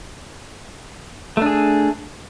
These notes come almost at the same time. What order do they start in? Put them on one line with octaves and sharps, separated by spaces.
A3 D4 G#4